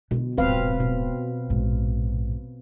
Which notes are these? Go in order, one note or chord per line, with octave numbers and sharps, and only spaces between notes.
B2 D3
D1 G#1 C4 B4 F5
B2
A#1 G#2